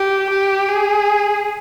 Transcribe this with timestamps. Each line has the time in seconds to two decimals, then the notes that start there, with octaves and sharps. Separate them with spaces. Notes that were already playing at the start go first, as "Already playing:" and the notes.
Already playing: G4
0.30 G4
0.69 G#4